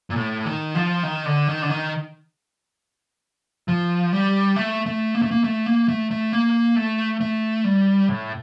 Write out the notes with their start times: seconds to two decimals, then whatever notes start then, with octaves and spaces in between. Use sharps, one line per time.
0.10 A#2
0.16 A2
0.45 D#3
0.75 F3
1.03 D#3
1.26 D3
1.48 D#3
1.62 D3
1.70 D#3
3.68 F3
4.12 G3
4.56 A3
4.86 A3
5.15 A#3
5.22 A3
5.31 A#3
5.44 A3
5.66 A#3
5.88 A3
6.11 A3
6.33 A#3
6.76 A3
7.21 A3
7.64 G3
8.09 A2